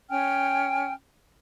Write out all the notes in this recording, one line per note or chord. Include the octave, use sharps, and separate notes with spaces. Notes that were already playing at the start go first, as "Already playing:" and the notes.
C#4 G5 G#5 F6